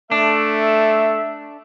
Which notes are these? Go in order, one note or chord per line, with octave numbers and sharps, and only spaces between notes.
A3 D4 E5